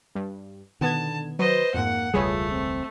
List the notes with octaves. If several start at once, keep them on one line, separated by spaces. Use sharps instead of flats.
G2
B2 D3 D#3 B3 A5 G#6
F#3 B4 C5 D#5
F2 G#2 A#3 F#5
E1 C#2 G3 A3 F4 G#4 B4 C#5
C4